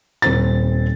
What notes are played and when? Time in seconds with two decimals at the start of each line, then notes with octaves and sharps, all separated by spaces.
0.22 D#1 C4 A6